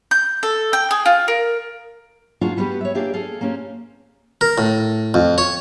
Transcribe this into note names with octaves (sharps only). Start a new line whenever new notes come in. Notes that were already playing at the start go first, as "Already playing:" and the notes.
G6
A4
G5
G#4
F4
A#4
A#3 D4 F4 F#4 G#4 F5
G3 B3 F#4 G4 B4
C#5 E5
A#3 D4 G4 G#4 D5
G#4 A4 F5
A#3 C4 C#4 G4
A#4
A2
F2
C#5